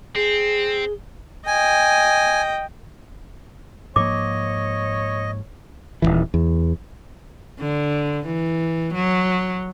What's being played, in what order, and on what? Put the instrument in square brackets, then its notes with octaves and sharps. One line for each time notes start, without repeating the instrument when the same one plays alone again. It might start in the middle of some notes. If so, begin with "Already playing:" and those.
[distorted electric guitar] C4 [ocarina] G#4
[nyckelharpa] D#5 G5 [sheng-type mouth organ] G#5
[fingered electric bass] G#2 F3 A#3 [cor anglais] C#5 [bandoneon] D#5 [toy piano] D6
[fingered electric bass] D#1 C2 E3
E2
[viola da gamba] D3
E3
F#3